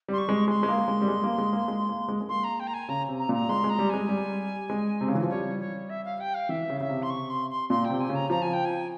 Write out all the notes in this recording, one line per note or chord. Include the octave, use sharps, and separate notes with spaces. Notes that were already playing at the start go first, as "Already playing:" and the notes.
G3 C6
C#6
G#3
G#3 C6
G#3
A#3
G#3
G3
G#3
A#3
G#3
A#3
G#3
A#3
G#3
G#3
A#3 C6
A#5
G5
A#5
G#5
C#3 A#5
C3
A#5
A#2 A#5
G#3 C6
G#3
A#5
G3
G#3 G#5
G3
G#3
C3
C#3
E3
F3
G3 C#5
C#5
E5
F5
G5
F5
E3 E5
C#3
C#3 E5
C3
C6
C#6
C6
C6
A#2 C6
G5
C3
G#5
C#3
A#5
F3 A#5
G#5
G5
G#5